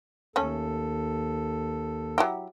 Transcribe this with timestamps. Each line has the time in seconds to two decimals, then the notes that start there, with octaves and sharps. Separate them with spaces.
0.36 D#2 A3 C#4 A4
2.18 F#3 E4 G4